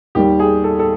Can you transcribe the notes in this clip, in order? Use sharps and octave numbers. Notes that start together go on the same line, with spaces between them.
D#2 D#3 G3 G4
G#4
A4
A4